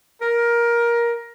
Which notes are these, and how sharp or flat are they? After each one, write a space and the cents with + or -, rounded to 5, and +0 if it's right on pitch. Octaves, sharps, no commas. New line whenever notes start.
A#4 +15